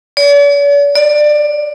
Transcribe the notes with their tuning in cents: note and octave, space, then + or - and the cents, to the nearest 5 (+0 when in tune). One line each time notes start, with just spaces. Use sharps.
D5 -45
D5 +20